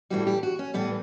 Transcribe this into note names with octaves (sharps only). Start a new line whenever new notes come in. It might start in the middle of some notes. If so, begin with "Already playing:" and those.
A2 E3 G3 F#4
G4
F#4
C#4
A2 E3 G3 B3